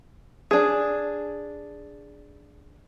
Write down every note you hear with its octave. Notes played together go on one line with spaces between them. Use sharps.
D4 G#4